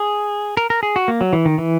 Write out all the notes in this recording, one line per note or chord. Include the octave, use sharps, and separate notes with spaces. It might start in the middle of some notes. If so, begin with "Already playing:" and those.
Already playing: G#4
A#4
A#4
G#4
F#4
A#3
F#3
E3
D#3
E3